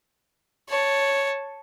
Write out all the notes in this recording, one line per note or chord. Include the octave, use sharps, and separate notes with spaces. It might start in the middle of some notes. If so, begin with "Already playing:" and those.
C#5 A5